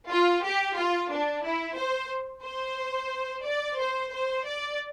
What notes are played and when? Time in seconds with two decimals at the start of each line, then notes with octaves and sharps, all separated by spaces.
0.09 F4
0.42 G4
0.76 F4
1.11 D4
1.43 E4
1.77 C5
2.43 C5
3.44 D5
3.78 C5
4.10 C5
4.45 D5